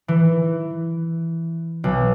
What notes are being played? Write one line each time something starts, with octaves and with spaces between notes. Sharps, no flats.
E3
B1